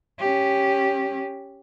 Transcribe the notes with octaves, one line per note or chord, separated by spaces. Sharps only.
C#4 G4